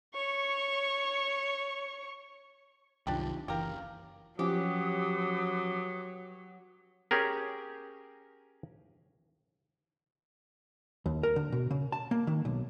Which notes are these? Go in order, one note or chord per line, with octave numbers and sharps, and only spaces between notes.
C#5 C#6
C2 F#2 D#3 D4 F4 G4
F#1 E3 G4 A#4 F5
F3 F#3 C#4 G4 B4 D6 D#6
C#4 G4 G#4 A#4
D#2
A#4
D3
B2
C#3
A5
A#3
D#3
B1